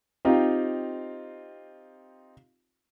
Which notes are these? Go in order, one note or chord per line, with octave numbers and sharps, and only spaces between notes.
C4 D#4 F4 G4